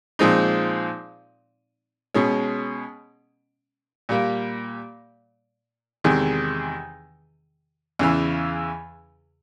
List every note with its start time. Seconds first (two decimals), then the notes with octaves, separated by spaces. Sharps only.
0.19 A#2 F3 G#3 C4 D#4
2.14 B2 G#3 C#4
4.09 A#2 G3 A#3
6.04 E2 C3 D#3 G#3
7.99 E2 C#3 E3